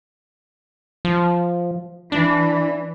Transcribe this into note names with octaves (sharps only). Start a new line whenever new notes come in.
F3
E3 D4